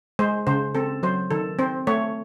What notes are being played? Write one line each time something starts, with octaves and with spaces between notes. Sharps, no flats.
G#3 C5
C#3 C5
C4 A4
F#3 C5
D#3 A4
C4 C5
A3 C#5